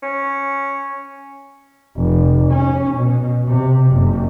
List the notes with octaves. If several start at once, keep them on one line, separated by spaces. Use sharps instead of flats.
C#4
F1
C#4
B2
C3
F#1